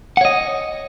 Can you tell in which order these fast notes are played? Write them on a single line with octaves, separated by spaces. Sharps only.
F#5 C#5 D#5